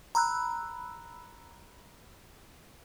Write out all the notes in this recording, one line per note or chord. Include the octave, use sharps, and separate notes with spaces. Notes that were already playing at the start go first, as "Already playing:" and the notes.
A#5 B5 E6 F#6